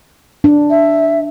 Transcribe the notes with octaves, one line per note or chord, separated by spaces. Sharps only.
D4
E5